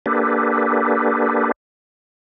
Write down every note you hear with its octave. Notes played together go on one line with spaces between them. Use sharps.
A#3 D4 G4 A4 B4